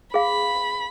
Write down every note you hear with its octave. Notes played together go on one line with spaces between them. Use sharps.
G#4 F5 B5